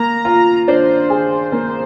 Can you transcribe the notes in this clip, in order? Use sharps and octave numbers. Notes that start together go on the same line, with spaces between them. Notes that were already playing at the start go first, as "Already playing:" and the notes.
Already playing: A#3 A#5
F4
D4 C5
G#4
A#3